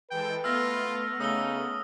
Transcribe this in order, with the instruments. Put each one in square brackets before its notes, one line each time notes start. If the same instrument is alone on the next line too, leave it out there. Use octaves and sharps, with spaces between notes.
[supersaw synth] E3 G#3 A4 [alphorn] B4 [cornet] G5
[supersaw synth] A3 B3 [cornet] F4 [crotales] E6 F6 A#6
[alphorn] C#3 [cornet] D#4 [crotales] D#6 E6 G7